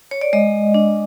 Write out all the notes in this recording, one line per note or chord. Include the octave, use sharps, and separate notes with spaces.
C#5
D5
G#3 D#5
D4